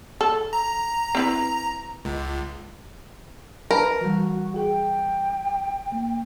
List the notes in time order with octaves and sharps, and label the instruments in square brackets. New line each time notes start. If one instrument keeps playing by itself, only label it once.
[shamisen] A4
[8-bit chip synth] A#5
[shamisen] C4 E4 B4
[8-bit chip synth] C#2
[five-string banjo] A#4 [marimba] B4 A5 B5
[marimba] E3 G3 [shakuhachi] F#4
[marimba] G#4 [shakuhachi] G5
[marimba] A#3